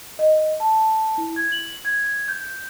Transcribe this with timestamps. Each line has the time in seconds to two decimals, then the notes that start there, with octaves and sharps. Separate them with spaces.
0.19 D#5
0.60 A5
1.18 E4
1.36 G#6
1.52 F#7
1.85 G#6
2.28 G6